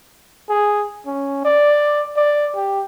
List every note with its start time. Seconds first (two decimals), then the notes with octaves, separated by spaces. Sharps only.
0.50 G#4
1.07 C#4
1.45 D5
2.17 D5
2.56 G4